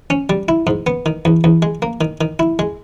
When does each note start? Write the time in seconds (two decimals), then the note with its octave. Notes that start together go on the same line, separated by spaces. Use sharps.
0.10 C#4
0.29 G3
0.48 E4
0.67 G#2
0.87 B3
1.06 D#3
1.25 E2
1.44 E2
1.62 G#3
1.82 A#3
2.01 D#3
2.21 D#3
2.39 E4
2.59 G#3